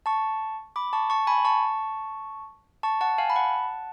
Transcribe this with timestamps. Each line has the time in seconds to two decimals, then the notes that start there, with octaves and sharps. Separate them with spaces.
0.06 A5 C#6
0.76 B5 D6
0.93 A5 C#6
1.10 A5 C#6
1.27 G#5 B5
1.45 A5 C#6
2.83 A5 C#6
3.01 F#5 A5
3.18 F5 G#5
3.30 B5
3.35 F#5 A5